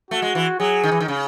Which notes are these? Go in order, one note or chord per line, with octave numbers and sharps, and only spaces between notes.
A3 F#4
G#3
E3
F#3 G#4
D#3
E3
D#3
C#3